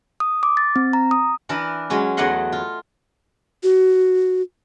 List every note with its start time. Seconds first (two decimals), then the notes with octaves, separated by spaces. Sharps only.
0.20 D#6
0.43 D6
0.57 A6
0.76 C4
0.93 A#5
1.11 D#6
1.49 E3 D4 A#4 B4
1.90 F#3 G#3 C#4
2.17 E2 F#3 A3 D#5 F#5 C6
2.52 F4
3.63 F#4